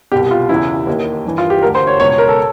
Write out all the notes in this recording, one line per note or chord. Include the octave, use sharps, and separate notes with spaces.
C2 B2 G4
F4
E2 C#3 E3 E4
D#2 D#3
G2 E3
F4
G4
D2 D3 A#4
C5
C#5
C#2 B2 C#5
C#5
A#4
A4